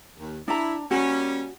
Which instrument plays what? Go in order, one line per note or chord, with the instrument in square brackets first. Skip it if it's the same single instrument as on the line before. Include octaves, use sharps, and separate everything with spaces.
[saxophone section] D#2
[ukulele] D4 A#5 [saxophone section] E4
[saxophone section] G3 A#3 C#4 [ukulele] F#4